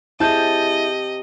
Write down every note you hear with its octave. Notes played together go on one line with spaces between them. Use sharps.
C3 E4 G#4 D#5 A5 G6